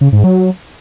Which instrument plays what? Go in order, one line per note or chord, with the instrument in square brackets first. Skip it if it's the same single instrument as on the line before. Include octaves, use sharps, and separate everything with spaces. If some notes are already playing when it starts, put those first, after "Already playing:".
[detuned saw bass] C#3
G#2
F#3